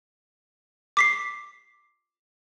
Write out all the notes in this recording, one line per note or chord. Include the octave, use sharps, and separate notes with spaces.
D6 B6 C7